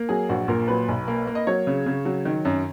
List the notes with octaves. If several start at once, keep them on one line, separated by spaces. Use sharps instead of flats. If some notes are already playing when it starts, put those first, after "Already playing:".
Already playing: A#3
F#3 G#4
A#1 F#4
A#2 A#4
F#3 B4
B1
A#3
A#3
D#5
F#3 C#5
C#3
C#3
F#3
D#3
F#2